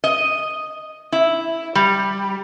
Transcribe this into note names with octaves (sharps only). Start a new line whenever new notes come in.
D#5
E4
G3